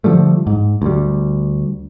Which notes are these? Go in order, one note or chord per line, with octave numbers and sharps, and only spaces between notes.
D3 F3 G3 A3
G#2
D2 G3